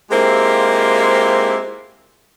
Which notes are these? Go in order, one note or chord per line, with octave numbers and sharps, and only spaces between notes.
G#3 A#3 C4 E4 F4 G4